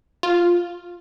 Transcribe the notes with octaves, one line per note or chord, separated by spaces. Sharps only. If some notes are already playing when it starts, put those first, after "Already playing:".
F4